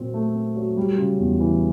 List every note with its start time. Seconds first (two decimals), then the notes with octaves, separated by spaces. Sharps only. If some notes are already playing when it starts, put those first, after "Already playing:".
Already playing: A#2 F#3 C4
0.14 A3
0.35 C4
0.56 F#3
0.77 G3
0.98 C#3
1.19 E2
1.40 E3